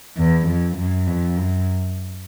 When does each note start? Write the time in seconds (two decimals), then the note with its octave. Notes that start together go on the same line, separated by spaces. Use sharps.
0.17 E2
0.47 F2
0.77 F#2
1.07 F2
1.37 F#2